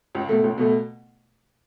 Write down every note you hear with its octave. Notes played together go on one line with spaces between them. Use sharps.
C#2
B2 A3
C#2
B2 A3